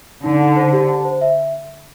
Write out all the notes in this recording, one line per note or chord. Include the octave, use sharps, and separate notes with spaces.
D3 D#4
D#4
C5
G4
A5
C5
E5